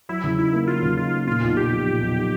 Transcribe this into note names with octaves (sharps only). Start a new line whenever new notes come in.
F#3 E4
C#3
D#4 E4
A#3
F#3 F4
C#3
D#4 F4
A#3
A#2 F4
B1
B1 G4
F3
A#2
B1